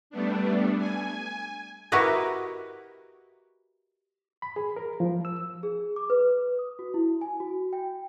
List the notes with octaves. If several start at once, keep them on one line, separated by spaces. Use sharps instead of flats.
G3 A3 B3 D4
G#5
E4 F#4 G4 A#4 B4 D#5
B5
G#4
A#4
F3
E6
G#4
D6
B4
D#6
F#4
E4
G#5
F#4
G5